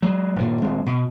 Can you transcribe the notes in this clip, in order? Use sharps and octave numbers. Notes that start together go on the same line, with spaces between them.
F#3 G#3
D#1 G2 A#2
D#1 G#3 C4
B2